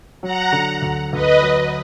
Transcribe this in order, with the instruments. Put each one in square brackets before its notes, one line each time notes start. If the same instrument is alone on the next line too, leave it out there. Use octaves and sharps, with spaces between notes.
[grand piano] F#3 [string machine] F#5 A#5
[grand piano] D3
D2
[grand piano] D2 [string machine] B4 D#5
[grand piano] F#3